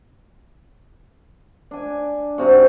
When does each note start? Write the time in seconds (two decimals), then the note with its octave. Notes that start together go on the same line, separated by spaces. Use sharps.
1.71 D4 G#5
2.38 G#2 C3 C4 F#4